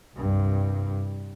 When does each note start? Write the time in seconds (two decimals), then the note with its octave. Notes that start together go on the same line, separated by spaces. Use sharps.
0.14 C2 G2